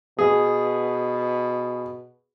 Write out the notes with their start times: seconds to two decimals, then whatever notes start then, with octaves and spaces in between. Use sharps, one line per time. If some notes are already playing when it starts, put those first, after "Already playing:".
0.19 B2 G#4